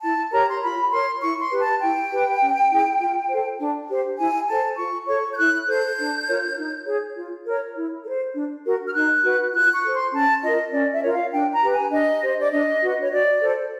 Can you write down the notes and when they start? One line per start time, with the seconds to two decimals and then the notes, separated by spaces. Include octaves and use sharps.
0.02 E4 A5
0.32 G4 A#4 C#5 A#5
0.50 C6
0.61 F4 B5
0.91 A#4 C#5 C6
1.21 E4 C#6
1.41 C6
1.51 G4 B4
1.60 A5
1.80 E4 G5
2.10 G4 B4
2.40 C#4
2.70 E4 G#4
2.99 F4
3.29 A4 C5
3.59 D4
3.89 G4 C5
4.18 E4 G#5
4.48 A4 C5 A5
4.78 F4 C#6
5.07 A4 C#5 C#6
5.31 G6
5.38 E4 F#6
5.67 A4 C5 G6
5.97 D4
6.27 F4 A#4 C#5
6.56 D#4
6.86 G#4 C#5
7.16 F4
7.46 A#4 C#5
7.76 E4
8.05 A4
8.10 C5
8.35 D4
8.65 F#4 A#4
8.88 F6
8.94 D#4 F#6
9.24 F#4 B4
9.53 F4 F#6
9.74 C#6
9.84 A4 C5
9.94 C6
10.13 C#4 A5
10.43 F4 A#4 D#5
10.73 C#4 D5
10.92 E5
11.02 F4 A#4 C#5
11.12 F5
11.32 D4 G5
11.52 A#5
11.62 G4 B4
11.72 G#5
11.92 D4 D#5
12.22 G4 C5
12.40 D5
12.51 D4 D#5
12.81 F#4 B4
13.00 C#5
13.11 F#4 D5
13.41 A4 C5